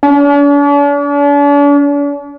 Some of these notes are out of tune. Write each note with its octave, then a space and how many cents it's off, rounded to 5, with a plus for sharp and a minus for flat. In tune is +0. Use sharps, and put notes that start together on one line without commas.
D4 -45